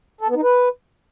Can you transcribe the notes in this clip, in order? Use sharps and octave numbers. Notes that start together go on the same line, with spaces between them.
A4
B3
D#4
B4